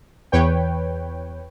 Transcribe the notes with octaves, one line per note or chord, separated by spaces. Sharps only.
E2 B4 C#5 G5